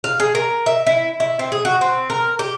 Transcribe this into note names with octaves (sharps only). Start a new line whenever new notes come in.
F5
G#4
A#4
E5
E4
E4
C4
G#4
F#4
C4
A#4
G4